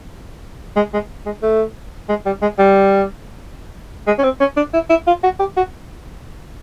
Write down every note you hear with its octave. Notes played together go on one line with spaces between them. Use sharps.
G#3
G#3
G#3
A3
G#3
G3
G#3
G3
G#3
C#4
C4
C#4
D4
E4
E4
F4
F#4
G4
F#4